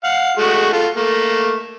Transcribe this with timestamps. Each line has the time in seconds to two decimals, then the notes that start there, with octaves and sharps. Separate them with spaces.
0.04 F5 F#5
0.37 G#3 A3 F#4
0.73 F4 A4
0.96 A3 A#3